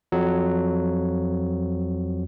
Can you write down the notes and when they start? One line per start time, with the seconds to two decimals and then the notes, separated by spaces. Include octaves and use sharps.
0.12 F2 F#3